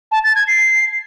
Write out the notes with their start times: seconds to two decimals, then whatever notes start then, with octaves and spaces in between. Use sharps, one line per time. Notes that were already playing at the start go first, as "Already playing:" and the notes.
0.12 A5
0.24 A6
0.35 G#6
0.47 C7